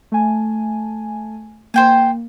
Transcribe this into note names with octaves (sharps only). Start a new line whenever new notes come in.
A3 G#5 A5
A#3 C5 G5 G#5